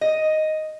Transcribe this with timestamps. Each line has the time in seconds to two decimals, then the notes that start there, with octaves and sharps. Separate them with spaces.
0.01 D#5